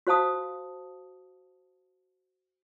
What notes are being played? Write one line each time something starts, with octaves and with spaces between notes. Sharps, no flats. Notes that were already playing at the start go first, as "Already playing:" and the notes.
F#4 C5 F5 A5 D#6